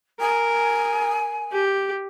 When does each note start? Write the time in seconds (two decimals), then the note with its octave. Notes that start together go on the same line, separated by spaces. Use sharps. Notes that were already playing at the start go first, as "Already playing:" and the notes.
0.20 A#4 G#5
1.52 G4